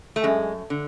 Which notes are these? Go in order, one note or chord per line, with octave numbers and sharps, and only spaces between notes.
A3
F#2 G#3
D3